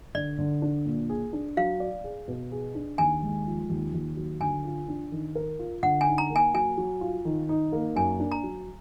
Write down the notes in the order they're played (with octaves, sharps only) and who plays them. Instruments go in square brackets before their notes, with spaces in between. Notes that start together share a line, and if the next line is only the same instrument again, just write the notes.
[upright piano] D3 [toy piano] D5
[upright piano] D3
D4
A#2
G#4
D4
[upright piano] F#3 [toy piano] F5
[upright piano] D5
G#4
B2
G#4
D4
[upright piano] D#2 [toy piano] G#5
[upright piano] G#3
F3
D#2
D#2
F#3
[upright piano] D3 [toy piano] G#5
[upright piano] F4
D4
D#3
A#4
F4
[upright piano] D3 [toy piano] F#5
[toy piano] G#5
[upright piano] D#4
[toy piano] A#5
[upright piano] A#3
[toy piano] G#5
[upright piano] F#3 [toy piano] G#5
[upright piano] F#3
F4
D#3
D#4
A#3
[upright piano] F#2 [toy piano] G#5
[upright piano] D4
[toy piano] A#5
[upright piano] F#3